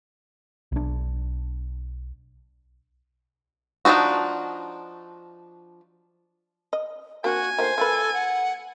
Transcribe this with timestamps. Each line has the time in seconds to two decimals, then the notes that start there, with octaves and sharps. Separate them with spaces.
0.72 B1 D4
3.85 F3 A3 D4 D#4 F#4
6.73 D#5
7.24 A#3 C4 D4 F#4 G#5
7.58 D#3 A3 A#3 C5
7.78 F3 A#3 A4 B4
8.13 F#5